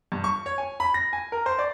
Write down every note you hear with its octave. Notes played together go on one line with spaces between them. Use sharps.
G2
C#6
C#5
G#5
B5
A#6
G#5
A#4
C5
D5